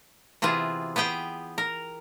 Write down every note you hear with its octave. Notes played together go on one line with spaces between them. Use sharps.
C3 E3 B3 F4 G#4
B3 G4 G#4 G5
A#4